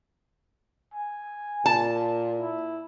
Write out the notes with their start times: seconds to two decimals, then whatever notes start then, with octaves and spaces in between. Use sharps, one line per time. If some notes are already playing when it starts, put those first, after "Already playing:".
0.94 G#5
1.66 A#2 A5
2.40 E4